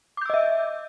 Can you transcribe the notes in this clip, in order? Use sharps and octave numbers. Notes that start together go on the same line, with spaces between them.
D#5 E5 D6 E6 G6